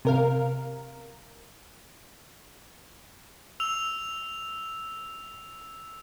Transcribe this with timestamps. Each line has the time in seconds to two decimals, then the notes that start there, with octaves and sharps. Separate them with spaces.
0.05 C3 A#4 F5
3.60 E6 F7